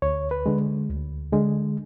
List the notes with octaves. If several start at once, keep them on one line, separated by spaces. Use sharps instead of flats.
D2 C#5
B4
D3 G#3
D2
D3 G#3